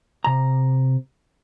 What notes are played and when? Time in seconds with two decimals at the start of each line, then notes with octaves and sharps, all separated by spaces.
0.24 C3 A#5